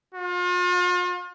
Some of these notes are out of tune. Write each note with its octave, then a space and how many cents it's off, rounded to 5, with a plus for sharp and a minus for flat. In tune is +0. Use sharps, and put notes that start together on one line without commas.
F4 +40